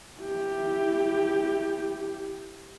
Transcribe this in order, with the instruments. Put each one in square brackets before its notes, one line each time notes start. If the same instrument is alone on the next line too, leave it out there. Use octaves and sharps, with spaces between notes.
[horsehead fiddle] E4 G4